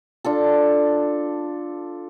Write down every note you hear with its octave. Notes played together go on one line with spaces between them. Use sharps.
D4 F4 A4